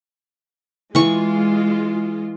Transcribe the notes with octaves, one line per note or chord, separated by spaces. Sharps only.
E3 G#3 F4 C#6